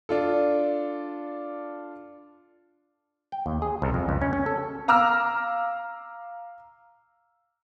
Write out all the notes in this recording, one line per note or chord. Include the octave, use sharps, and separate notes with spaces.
D4 F4 A4
G5
D#2
G#4
C2
F2
C#2
C#4
C#4
A4
F5 A#5 D6 E6 F6